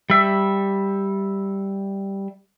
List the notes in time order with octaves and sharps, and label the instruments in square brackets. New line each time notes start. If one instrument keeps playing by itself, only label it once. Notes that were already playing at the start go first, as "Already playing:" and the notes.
[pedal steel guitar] G3 E5